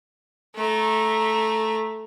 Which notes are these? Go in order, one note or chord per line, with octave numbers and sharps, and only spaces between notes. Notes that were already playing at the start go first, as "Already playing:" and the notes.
A3 A#5